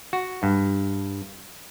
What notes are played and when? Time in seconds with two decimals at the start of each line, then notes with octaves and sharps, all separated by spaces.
0.13 F#4
0.43 G2